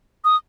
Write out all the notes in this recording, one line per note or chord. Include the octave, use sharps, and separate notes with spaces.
D#6